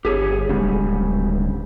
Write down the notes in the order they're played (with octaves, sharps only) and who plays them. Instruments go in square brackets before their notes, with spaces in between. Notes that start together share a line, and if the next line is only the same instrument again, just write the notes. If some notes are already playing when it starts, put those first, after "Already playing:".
[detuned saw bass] G1 [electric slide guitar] G4 G#4 C#5
[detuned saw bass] D1 [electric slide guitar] G#2 C#3 G3